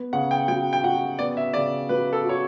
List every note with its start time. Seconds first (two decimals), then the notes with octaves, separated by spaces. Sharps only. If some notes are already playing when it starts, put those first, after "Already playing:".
Already playing: B3
0.13 C#3 F#5
0.31 G5
0.48 F#3 G5
0.73 G5
0.83 F#4 F#5
1.19 B3 D5
1.37 E5
1.54 C#3 D5
1.89 F#3 B4
2.13 A4
2.24 F#4
2.29 C#5